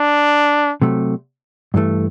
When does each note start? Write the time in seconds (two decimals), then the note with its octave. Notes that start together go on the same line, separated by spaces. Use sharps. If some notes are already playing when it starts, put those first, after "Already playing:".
Already playing: D4
0.82 C3 F#3 A3
1.74 G2 E3 A3